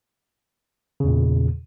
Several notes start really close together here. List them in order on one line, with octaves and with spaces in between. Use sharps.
C#3 E2 A#2